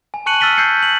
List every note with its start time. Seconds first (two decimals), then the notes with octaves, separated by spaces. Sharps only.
0.14 G#5
0.26 A5 C#6 F#6 C#7 D#7 F#7
0.40 E6 F6 A6 B6 D#7 G7
0.57 G6 C7 C#7
0.83 F#7